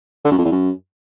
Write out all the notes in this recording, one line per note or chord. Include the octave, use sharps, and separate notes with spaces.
D3
F#2
F2
E2
F#2